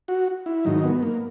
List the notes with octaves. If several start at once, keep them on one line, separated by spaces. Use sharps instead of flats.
F#4
E4
G#2 D#3 F#3 D#4
B3
A#3